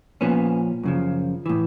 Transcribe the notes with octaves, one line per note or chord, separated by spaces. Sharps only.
A#2 F3 B3 C#4
F#2 C#3 F3
A2 E3